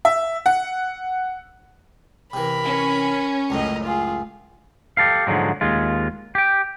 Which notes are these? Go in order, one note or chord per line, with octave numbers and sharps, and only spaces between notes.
E5
F#5
C3 E3 A#4 B5
C#4
C#2 F#2 A2 D#5 A#5
F4 G#4
G4 A4 A#4 F5
G#2 D3 F3 F#3 G#3
D#2 G#3 F4
G4 G5